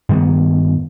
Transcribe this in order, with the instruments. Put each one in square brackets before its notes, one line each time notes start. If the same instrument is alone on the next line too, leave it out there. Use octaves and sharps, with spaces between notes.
[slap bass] G2 D#3 B3